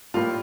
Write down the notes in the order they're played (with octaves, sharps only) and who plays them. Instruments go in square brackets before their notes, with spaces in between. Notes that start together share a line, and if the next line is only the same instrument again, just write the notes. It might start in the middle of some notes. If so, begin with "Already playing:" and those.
[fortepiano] A2 G3 A#3 E4 [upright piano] F4